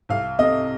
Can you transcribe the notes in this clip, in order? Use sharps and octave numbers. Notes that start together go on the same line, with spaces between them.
C2 F5
C3 D#5